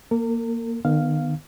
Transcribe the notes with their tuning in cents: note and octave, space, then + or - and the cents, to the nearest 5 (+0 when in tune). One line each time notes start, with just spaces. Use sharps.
A#3 +0 A#4 -40
D#3 -35 B3 +0 F5 +0